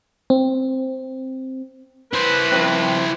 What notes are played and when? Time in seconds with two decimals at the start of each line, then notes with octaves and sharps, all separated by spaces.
0.30 C4
2.14 E4 B4 C5
2.52 F2 C4